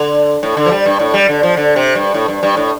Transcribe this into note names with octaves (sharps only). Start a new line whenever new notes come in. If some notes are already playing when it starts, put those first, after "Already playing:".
Already playing: D3
A2
D3
F3
G3
G2
A2
G3
D3
F3
D3
C3
G2
A2
G2
G2
A2